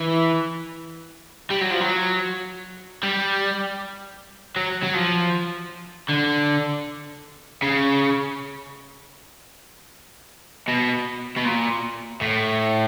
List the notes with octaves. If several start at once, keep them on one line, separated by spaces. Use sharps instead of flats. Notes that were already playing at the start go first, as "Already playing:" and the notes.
Already playing: E3
G3
F#3
F3
F#3
G3
F#3
F#3
F3
D3
C#3
B2
B2
A#2
A2